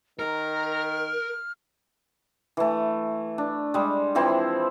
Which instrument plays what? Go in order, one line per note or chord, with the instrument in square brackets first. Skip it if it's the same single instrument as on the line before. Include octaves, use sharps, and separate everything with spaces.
[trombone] D#3 [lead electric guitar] A#4 [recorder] F6
[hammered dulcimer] E3 A3
D4
G3 G#3
E3 F3 C4 E4